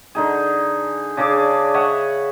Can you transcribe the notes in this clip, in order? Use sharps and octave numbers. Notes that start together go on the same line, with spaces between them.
D3 D#4 G#4
C#3 D4 G#4 D6
C#5 D#5 E5 F#5